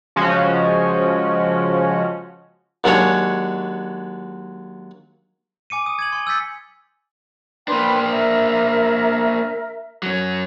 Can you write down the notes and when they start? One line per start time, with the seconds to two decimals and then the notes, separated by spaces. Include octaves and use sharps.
0.16 C#3 F3 G#3 C#4 F#4
2.84 D#2 F#3 G#3 C#4 D4 C#5
5.70 G#5 D6 C#7 D#7
5.86 D#6
5.99 G#6 D#7 F#7
6.12 G#5 C6
6.27 E6 G6 A6 B6 C#7
7.68 A#3 D4 B4 G5 C6
8.11 A#4 E5
10.03 F#3 C#4